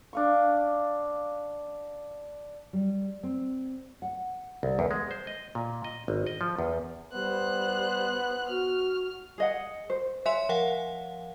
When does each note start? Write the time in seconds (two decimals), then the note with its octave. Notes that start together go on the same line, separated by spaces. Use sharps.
0.13 D4 F5 C#6
2.73 G3
3.23 C4
4.02 F#5
4.63 C2
4.79 E2
4.91 G#3
5.11 C5
5.27 D#5
5.55 A#2
5.84 D#5
6.08 G#1
6.26 D#5
6.41 F3
6.59 E2
7.13 G3 B3 C5 F#6
8.49 F#4 F6
9.38 G#4 D#5 F#5
9.90 C5
10.26 C#5 E5 G#5 C6
10.49 F3 F5 F#5